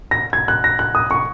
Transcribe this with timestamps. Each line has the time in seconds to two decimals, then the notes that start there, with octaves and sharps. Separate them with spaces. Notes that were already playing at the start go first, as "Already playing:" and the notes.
0.11 A#6
0.33 G#6
0.48 F#6
0.64 A#6
0.79 F#6
0.95 D#6
1.11 C#6